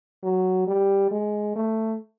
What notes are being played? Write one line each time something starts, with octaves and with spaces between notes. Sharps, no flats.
F#3
G3
G#3
A3